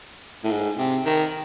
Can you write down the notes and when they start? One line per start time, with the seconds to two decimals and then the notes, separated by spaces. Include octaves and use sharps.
0.44 A2
0.50 G#2
0.77 C3
1.06 D#3